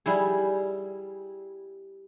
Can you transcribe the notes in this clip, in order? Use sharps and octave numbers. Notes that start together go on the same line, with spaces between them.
G3 E4 G#4